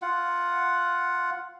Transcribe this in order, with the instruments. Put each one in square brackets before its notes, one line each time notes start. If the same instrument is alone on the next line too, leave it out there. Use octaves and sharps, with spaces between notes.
[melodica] F4 F#5